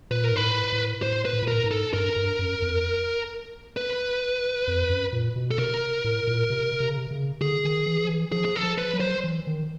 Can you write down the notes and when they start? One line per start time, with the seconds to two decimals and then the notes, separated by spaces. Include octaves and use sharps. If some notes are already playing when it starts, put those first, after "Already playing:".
0.11 A#2 B4
0.24 A#4
0.32 G#2 B4
0.41 A2
0.72 A2
1.02 A2 C5
1.25 B4
1.33 A2
1.43 A#2
1.48 A2 A#4
1.64 G#2
1.71 A4
1.93 G2 A#4
2.16 G2
2.39 F#2
2.62 F2
3.77 B4
4.68 F2
4.90 F#2
5.13 A#2
5.36 B2
5.51 A4
5.58 C3 A#4
6.04 A2
6.27 A#2
6.50 C3
6.80 C3
6.89 C#3
6.97 C3
7.11 C#3
7.41 D3 G#4
7.65 D#3
7.86 E3
8.05 F3
8.09 E3
8.32 F3 G#4
8.45 G#4
8.56 A4
8.63 F3
8.78 B4
8.93 F#3
9.00 C5
9.24 E3
9.47 D#3